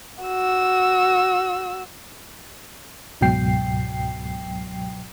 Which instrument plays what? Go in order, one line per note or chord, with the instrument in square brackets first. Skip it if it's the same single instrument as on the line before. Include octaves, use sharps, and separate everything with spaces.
[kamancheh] F#4 E6
[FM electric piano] C#2 G#2 B2 F#3 G5 C7